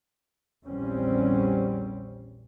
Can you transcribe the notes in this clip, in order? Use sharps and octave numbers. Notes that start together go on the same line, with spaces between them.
A#1 E2 G3 C4 C#4